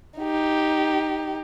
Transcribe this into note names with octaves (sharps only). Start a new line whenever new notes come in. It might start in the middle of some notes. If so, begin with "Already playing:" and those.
D#4 G4